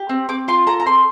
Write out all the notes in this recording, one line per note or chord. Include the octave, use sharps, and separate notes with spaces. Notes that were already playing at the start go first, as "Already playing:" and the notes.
Already playing: G4
C4
C4 D6
F4 C6
A4 A#5
A#5
C4 C6